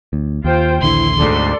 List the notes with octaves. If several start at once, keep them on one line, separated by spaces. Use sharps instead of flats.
D2
D#2 F4 C5 G5
A#1 D#2 D3 E4 C6
D2 G#2 A4 D5